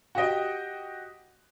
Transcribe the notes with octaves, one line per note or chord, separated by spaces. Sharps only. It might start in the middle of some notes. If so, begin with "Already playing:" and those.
F#4 G4 D#5 G5